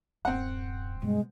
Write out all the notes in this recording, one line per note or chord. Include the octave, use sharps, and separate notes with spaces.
D1 F#2 C4 F#5
G2 B2 G3 G#3